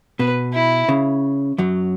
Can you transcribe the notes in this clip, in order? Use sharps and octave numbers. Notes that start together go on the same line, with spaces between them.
B2 B4
E4
C#3
F#2 F#3